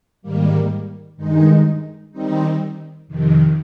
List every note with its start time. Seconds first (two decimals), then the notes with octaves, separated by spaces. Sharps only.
0.22 G#2 D#3 G3 A#3
1.16 G2 D#3 G#3 D#4
2.12 D#3 G3 C4 D#4
3.08 F2 C3 D#3